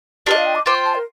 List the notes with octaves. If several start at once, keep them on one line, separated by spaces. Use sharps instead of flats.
D4 F4 G4 A4 D#5
F5
G5
D6
F4 C5 G5 D6
C6
A5
A#4